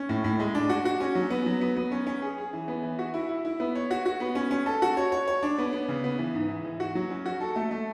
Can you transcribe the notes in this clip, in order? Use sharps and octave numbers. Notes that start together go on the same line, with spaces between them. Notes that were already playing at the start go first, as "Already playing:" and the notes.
Already playing: C#4
A2
A2
G#3
D4
F#4
F#4
C#4
F#3
B3
F#3
B3
B3
C#4
C#4
G#4
G#4
E3
B3
E3
F#4
E4
E4
E4
B3
C#5
F#4
F#4
B3
C#4
C#4
A4
F#4
C#5
C#5
C#5
D4
B3
B3
C#3
B3
E3
G#2
E3
E3
F#4
F#3
C#4
F#4
A4
A3
A3